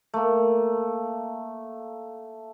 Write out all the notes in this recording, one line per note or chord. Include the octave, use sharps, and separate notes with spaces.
A3 A#3